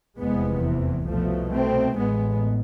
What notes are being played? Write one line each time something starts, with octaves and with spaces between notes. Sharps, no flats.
F1 E2 C3 G#3 B3
E3
C2 B2 F3 A3
A3 C4
A1 A2 G#3 B3